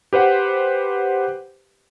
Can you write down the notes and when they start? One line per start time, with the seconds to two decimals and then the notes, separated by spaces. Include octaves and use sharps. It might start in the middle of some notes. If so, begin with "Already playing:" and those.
0.13 G4 B4 C5 F#5